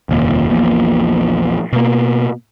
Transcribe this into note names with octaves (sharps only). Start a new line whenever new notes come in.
F1 D#2 A#2
A#1 E2 A#2
B2 A#3